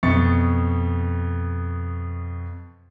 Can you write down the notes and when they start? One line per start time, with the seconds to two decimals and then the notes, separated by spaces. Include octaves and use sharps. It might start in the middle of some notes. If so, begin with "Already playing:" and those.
0.03 F2 B2 C#6 A6 C#7